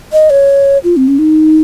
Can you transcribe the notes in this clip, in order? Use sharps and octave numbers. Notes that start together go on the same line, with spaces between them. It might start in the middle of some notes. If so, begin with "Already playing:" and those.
D#5
C#5
F4
C4
C#4
D#4